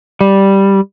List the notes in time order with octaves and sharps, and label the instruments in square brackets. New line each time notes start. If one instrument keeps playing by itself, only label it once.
[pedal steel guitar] G3